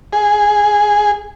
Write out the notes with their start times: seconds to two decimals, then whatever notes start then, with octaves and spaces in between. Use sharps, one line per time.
0.13 G#4